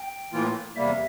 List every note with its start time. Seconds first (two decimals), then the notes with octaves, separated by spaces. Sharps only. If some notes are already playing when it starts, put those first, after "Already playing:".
Already playing: G5
0.32 A2 E3 A#3 F4
0.76 E2 C3 G3 A#3 E5